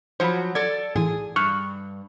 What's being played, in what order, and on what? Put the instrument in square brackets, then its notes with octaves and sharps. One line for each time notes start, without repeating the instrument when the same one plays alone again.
[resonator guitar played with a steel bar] F3 F#3 [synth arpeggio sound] C5 B5
[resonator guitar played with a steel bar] A4 D5 [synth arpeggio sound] G#6
[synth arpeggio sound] A2 E3 [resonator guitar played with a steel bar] G#4
[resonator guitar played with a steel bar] G2 [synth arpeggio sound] C#6 F6 F#6